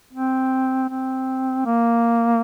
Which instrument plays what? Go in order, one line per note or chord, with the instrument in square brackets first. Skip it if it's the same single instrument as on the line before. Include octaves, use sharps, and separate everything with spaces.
[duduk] C4
C4
A#3